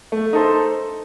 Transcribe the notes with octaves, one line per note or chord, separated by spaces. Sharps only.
A3
D#4 A4 C5